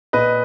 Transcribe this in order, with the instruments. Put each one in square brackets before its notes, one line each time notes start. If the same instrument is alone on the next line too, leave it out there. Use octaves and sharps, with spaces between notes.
[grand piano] A#2 B4 D#5